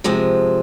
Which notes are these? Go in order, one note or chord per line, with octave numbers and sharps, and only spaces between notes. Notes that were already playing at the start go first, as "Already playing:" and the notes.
C3 F3 G#3